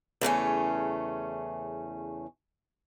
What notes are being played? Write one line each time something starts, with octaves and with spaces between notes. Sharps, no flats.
E2 C#3 A3 C#4